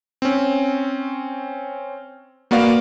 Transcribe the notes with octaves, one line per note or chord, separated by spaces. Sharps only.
C4 C#4
A#3 B3 F#4 D5 F5